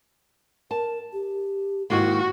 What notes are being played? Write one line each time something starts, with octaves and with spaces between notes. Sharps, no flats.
A#4 A5
G4
G#2 D#3 A#3 E4 F#4